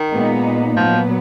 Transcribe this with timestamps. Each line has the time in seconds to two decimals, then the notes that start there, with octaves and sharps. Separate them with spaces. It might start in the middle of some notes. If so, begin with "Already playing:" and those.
Already playing: D#3
0.12 A#2 G#3 B3 D#4
0.76 A#2 F3 F#3 B3